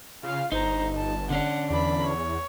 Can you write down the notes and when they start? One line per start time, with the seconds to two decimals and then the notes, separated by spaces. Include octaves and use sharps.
0.23 C#3 F4 F5
0.52 G1 D#4 C5 A#5
0.97 A5
1.30 D3 C#4 D4 F#5
1.70 E2 D5 B5
2.06 C#5